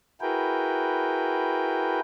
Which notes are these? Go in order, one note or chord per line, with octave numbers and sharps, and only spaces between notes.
E4 F#4 G#4 A#4 B4 G5